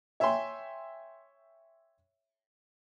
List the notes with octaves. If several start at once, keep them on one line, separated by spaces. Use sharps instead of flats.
C#5 E5 G5 G#5 C6